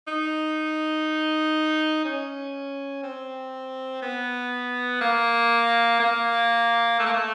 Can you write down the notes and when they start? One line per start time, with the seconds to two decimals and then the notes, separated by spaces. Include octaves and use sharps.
0.08 D#4
2.05 C#4
3.03 C4
4.02 B3
5.01 A#3
6.00 A#3
6.99 A3
7.06 A#3
7.14 A3